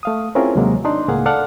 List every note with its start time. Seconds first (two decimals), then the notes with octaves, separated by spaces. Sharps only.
0.03 A3 F5 D#6
0.35 C4 C#4 E4 F4 G#4 A#4
0.55 D#2 C3 F#3 G#3 A#3
0.85 D4 D#4 D5 C6
1.08 C#2 A2 A#3 G#4 F5 F#5
1.26 A4 D5 F5 F#5 A5 F6